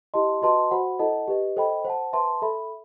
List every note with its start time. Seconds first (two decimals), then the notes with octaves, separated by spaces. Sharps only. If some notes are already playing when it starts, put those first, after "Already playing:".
0.14 E4 G4 D#5 A5 C6
0.42 F#4 B4 D#5 A5 C6
0.71 F#4 C5 F#5 B5
0.99 E4 A4 D#5 F#5 A5
1.28 G4 B4 D#5
1.57 A4 C5 D#5 G5 B5
1.85 C5 F#5 A5
2.13 B4 E5 A5 C6
2.42 A4 E5 B5